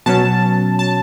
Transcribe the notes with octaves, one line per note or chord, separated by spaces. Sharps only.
B2 F#3 C#4 A5
A5